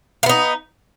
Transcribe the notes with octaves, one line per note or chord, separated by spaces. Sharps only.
A#3 B3 D#4